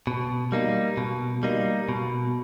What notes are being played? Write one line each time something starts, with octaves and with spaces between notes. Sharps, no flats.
B2
G3 A#3 D#4
B2
G3 A#3 D#4
B2